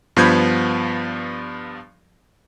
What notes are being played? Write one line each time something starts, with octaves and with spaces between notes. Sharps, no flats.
G2 F3 B3 B5 G6 G#6